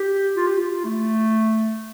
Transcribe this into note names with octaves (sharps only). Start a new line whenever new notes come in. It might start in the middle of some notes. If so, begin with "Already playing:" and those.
Already playing: G4
F4
G4
F4
A3